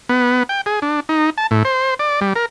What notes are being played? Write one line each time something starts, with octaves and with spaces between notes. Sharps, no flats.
B3
G5
G#4
D4
D#4
A5
A2
C5
D5
G3
A#4